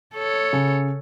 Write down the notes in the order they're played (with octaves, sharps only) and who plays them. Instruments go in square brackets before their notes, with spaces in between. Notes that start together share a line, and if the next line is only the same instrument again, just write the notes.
[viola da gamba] A4 C#5
[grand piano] C#3